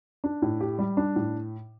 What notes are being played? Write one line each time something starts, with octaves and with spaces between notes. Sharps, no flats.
D4
A2
G4
G3
D4
A2